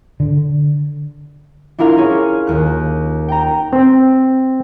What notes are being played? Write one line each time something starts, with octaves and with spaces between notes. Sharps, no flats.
D3
D4 E4 F4 A#4 F5
C#4 G#4 C#5
D#2 F#6
G5 A#5
C4